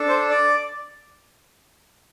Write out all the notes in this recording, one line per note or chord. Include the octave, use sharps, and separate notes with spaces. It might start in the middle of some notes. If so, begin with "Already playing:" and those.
Already playing: D4 A4
C5
D5